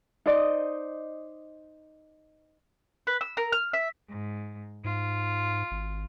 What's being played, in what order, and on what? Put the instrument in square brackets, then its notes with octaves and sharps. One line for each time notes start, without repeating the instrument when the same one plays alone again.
[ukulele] D#4 C5 D5 D#5
[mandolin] B4
E6
A#4
F6
E5
[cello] G#2
[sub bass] G#2 [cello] F4
[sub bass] G#1